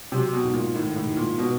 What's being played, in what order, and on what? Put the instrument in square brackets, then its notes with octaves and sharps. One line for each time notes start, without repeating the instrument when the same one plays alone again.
[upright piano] C3 [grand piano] F#3
[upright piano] B2
[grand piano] G#2
[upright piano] A#2
[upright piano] A2 [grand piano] D#3
[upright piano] A2
[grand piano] G#2
[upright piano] A#2
[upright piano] B2 [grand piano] B3